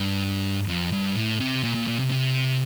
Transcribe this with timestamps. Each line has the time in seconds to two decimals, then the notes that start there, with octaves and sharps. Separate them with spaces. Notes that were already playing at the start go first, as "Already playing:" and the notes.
Already playing: G2
0.68 F2
0.93 G2
1.16 A2
1.40 C3
1.63 A#2
1.75 A#2
1.87 A#2
1.99 C3
2.12 C3